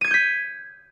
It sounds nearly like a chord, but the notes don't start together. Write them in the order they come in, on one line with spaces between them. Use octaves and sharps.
D#7 G#6 C#7 G6 B6